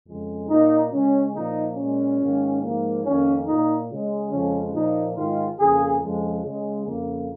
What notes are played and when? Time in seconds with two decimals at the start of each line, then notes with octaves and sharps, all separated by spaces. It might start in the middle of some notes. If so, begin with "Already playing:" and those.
0.08 F2 C#3 G#3
0.50 A#2 A#3 D#4
0.92 C#3 G#3 C#4
1.34 A#2 F3 A#3 D#4
1.76 A#2 G#3 C#4
2.19 G#2 D#3 A#3
2.62 G#2 F3 A#3
3.04 F2 D#3 A#3 C#4
3.46 A#2 A#3 D#4
3.89 C#3 G#3
4.31 F2 C#3 F3 G#3 C#4
4.73 A#2 F3 A#3 D#4
5.16 G#2 D#3 G#3 F4
5.58 F2 C#3 A#3 G#4
6.01 F2 C#3 F3 G#3
6.43 C#3 G#3
6.85 F2 C#3 A#3